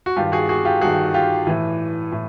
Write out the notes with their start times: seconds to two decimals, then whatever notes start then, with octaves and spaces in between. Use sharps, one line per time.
0.06 F#4
0.16 G2 D#3 F4 G4
0.32 F#4 G#4
0.49 F#4 G#4
0.65 F4 G4
0.81 G2 D#3 F#4 G#4
1.14 F4 G4
1.47 A2 E3
2.12 A2